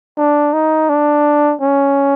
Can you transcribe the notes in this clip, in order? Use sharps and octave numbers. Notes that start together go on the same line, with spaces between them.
D4
D#4
D4
C#4